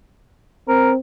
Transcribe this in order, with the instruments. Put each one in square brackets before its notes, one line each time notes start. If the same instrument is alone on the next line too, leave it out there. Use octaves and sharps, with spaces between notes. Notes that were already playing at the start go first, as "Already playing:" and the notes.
[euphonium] C4 [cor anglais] A#4